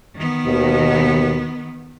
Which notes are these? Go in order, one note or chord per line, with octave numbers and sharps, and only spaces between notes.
D#3 B3
D#2 B2